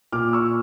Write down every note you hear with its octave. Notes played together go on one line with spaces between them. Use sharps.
A#2 D6 F6
C#6 E6